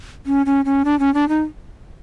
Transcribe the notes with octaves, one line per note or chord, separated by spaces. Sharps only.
C#4
C#4
C#4
D4
C#4
D4
D#4